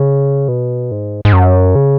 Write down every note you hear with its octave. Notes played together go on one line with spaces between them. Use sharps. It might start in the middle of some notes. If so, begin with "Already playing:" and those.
Already playing: C#3
B2
G#2
G#2
F#2
C#3